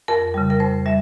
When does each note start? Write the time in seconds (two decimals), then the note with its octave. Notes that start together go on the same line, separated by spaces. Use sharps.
0.08 F2 A#4
0.34 C#3 G3
0.50 A#4
0.60 F2 C5
0.86 G3 E5